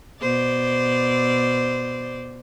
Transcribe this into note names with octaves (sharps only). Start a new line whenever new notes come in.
B2 C5 D5